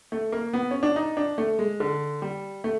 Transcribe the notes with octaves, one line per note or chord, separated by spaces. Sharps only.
A3
A#3
B3
C#4
D4
D#4
D4
A3
G#3
D3
G3
A3